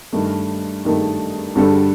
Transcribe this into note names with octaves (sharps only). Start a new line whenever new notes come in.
G2 D#3 A3
G2 D#3 A3
G2 D3 G3 D4 A4